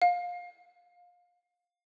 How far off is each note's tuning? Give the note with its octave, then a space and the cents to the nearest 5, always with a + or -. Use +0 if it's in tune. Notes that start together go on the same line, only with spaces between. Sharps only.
F5 +25